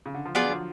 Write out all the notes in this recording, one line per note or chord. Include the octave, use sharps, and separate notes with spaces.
C#3
D3
F3
F#3 B3 F4 G#4 D5
D3
F3